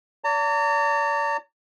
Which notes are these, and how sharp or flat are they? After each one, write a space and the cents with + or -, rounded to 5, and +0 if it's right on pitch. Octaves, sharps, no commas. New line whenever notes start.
D5 -40 A#5 -45